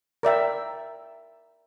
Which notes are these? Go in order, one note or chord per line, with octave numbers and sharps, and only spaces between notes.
A#4 D5 E5 G5